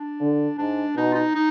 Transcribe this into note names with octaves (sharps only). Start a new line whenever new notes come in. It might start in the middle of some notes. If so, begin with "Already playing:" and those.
Already playing: D4
D3
G#2 D4
B2 D#4
F4
D#4
D#4